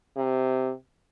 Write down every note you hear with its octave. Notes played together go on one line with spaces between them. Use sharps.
C3